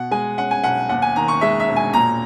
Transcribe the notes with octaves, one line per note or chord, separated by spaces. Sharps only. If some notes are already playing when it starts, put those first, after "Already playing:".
Already playing: B2 F#5
G#3 G#5
C#4 F#5
G#5
B1 F#5
D#2 F#5
G#5
D#3 A#5
C#6
G#3 E5
E5
E1
G#5
A#2 A#5